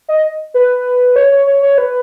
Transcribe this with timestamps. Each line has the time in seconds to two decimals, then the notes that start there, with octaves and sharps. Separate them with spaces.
0.08 D#5
0.54 B4
1.16 C#5
1.32 C#5
1.47 C#5
1.63 C#5
1.78 B4